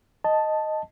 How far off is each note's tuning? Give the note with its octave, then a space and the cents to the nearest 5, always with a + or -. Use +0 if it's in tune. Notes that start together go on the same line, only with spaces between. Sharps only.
D#5 +0 A5 +0